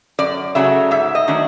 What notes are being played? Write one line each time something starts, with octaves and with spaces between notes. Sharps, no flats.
F#2 D5
C#3 F#3 A3 E5
G#2 E5
D#5
D#3 F#3 A3 D4